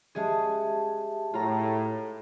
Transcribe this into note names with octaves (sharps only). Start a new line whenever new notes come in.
G#3 C#4 G4 G#4 E5 A5
A2 F4 A#5